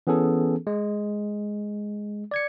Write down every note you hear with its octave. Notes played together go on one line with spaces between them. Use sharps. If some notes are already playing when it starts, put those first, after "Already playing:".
E3 B3 C#4 G#4 A4
G#3
D5 G#6 C#7